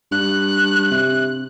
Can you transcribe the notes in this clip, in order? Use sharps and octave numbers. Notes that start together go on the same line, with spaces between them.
G2 F#6
C3